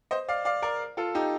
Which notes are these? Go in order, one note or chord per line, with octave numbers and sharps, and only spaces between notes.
C5 D#5
D5 F5
D5 F5
A#4 D5
F4 A4
D#4 G4